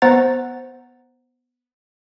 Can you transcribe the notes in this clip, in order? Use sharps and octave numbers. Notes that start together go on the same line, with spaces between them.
B3 C5 F#5 A#5 A6